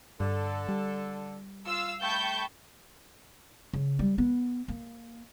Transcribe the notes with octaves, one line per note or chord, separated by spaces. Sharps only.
G2 D3 A4
G3
F4 F5 E6
A3 G5 A5 B5 C#6 G6
C#3
G3
B3
A#3